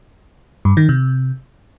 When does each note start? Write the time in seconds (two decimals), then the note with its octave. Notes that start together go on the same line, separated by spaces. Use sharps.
0.65 G2
0.77 D#3
0.89 C3